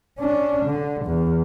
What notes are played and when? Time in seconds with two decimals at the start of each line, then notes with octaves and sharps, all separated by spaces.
0.19 C#4 D4
0.66 D3
1.06 E2